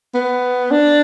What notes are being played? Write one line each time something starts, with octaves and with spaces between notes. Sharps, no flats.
B3
D4